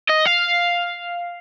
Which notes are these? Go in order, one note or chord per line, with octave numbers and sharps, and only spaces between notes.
D#5
F5